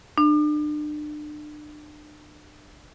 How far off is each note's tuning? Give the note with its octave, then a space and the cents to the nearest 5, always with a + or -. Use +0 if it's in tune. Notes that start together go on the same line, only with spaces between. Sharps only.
D4 +35